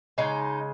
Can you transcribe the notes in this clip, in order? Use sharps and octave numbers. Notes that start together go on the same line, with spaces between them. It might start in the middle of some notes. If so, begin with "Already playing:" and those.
C#3 G#3 D#4